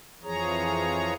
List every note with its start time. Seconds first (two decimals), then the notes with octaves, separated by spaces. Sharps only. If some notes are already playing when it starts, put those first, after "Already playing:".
0.23 F2 E3 F3 G#4 C#5 A#5